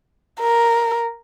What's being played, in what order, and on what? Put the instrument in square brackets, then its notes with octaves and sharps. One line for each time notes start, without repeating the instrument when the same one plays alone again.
[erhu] A#4